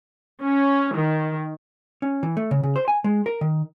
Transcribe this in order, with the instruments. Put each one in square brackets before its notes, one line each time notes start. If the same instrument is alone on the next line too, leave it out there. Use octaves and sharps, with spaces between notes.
[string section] C#4
D#3
[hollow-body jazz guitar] C#4
E3
A3
C#3
C#3
C5
G#5
G#3
A#4
D#3